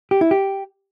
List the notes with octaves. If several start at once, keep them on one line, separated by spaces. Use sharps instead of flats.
G4
E4
G4